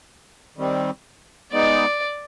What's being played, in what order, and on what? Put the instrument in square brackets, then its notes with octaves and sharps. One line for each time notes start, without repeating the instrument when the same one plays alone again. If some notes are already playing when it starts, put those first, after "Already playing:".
[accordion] D#3 G3 C4
[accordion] G#3 B3 D#4 [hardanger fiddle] D5